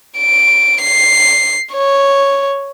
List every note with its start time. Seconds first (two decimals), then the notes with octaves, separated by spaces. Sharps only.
0.19 D7
0.81 C7
1.74 C#5